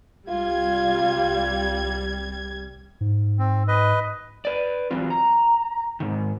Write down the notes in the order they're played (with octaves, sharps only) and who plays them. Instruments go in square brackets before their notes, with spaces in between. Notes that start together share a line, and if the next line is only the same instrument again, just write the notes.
[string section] C2 G3 G#6 [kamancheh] F4
[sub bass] G#2
[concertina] C4
B4 D#5
[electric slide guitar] B4 D5
E3 F#3 G3 C4 F4
A#5
G#2 D#3